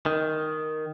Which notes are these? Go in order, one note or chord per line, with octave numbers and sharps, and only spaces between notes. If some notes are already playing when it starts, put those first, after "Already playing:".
D#3